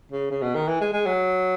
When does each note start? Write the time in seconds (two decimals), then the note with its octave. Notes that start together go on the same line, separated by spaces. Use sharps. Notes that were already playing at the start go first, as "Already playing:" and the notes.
0.12 C#3
0.31 C#3
0.42 B2
0.55 D#3
0.68 E3
0.81 G#3
0.92 G#3
1.06 F#3